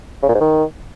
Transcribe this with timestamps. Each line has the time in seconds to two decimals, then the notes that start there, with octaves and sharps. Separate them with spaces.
0.23 C#3
0.29 A#2
0.34 G#2
0.40 D#3